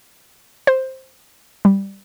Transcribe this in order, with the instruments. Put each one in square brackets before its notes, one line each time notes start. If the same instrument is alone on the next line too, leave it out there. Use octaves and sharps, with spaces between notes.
[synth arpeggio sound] C5
G3